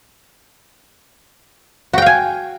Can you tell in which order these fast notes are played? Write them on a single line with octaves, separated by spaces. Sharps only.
F#4 G5 F5 G#5